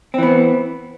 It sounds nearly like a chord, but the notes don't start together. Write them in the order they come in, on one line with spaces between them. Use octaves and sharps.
C4 E3 B3